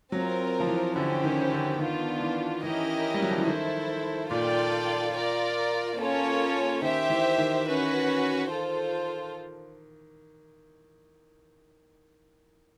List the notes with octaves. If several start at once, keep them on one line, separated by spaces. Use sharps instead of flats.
F#3 C4 F4 A#4
F3
E3
D3 C#4 E4 G4 C5
D#3
D3
D#3 B3 D4 F4
E3
E3 C#4 E4 G4 A#4 D#5
G3
F#3
F3
E3
D#3 E4 A4 C5
A#2 F4 A4 D5 G5
F4 A#4 D5
A#3 C#4 F4 A4 C#5
D#3 G4 C5 E5
E3
D#3
C#4 F#4 B4
F4 A4 C5